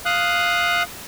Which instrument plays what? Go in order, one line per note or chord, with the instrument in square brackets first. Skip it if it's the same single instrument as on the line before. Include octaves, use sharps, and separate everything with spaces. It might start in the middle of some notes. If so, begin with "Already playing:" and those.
[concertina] F5 D#6 F#6